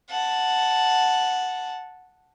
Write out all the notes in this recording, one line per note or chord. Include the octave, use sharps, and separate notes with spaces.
F#5 A5